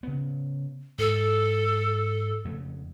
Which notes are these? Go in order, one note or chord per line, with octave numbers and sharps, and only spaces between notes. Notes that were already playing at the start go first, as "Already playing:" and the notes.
C#3 B3
G#2 A4
F2 C#3 A3